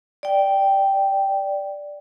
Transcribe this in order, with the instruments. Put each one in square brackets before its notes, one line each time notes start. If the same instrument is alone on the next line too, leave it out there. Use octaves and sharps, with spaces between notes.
[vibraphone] D5 G5